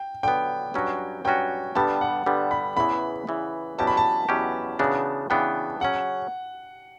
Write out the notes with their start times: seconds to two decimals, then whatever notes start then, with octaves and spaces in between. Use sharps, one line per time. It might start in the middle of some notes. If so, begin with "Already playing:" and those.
Already playing: G5
0.23 D3 F#3 B3 G5
0.74 G2 F#3 C#4 F#4
1.25 G2 F#3 C#4 F#4 G5
1.75 G2 D3 G3 B3 A5
2.01 F#5
2.26 G2 D3 G3 B3
2.51 B5
2.77 E2 C#3 E3 B3 B5
3.27 E2 C#3 E3 B3
3.79 E2 B2 F#3 C#4 G4 A5
3.87 B5
3.97 A5
4.29 E2 B2 F#3 C#4 G4
4.79 C#3 E3 B3 D4 F#4
5.30 C#3 E3 B3 D4 F#4 G5
5.80 C#3 F#3 C#4 F#5